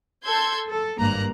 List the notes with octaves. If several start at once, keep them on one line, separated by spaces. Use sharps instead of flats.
A4 C6 E6 G6 G#6
A4
G#1 G2 A#3 A#5 F#6